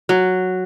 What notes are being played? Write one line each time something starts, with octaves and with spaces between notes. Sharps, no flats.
F#3